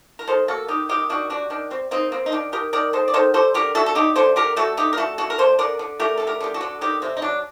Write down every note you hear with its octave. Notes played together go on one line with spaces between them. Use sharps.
A#4
D#3 A4 C5
A#3 F#4 A4
D#3 D#4 G4
D#3 D#4 G4
D#3 D4 F#4
G3 D4 F#4
D#3 D4
G3 C4
A#3 C4 D#4
A#3 C4
D#4
D#3 D4
D#3 G4 A#4
D#3 A#4 D5
D#3 A4 C5
D5
D#3 A4 C5
G3 A4 C5
D3 G4 A#4
A3 F#4 A4
A4
D3 D#4 G4
D3 A4 C5
D3 G4 A#4
A3 F#4 A4
D3 D#4 G4
A#4
A3 F#4 A4
D3 F#4 A4
A#4
D3 A4 C5
D3 A#4 D5
D3
A3 G4 A#4
D3 A4
G4 A#4
D3 G4
F#4 A4
D3
D#3 D#4 G4
C3 C4
D#4
F#3 D4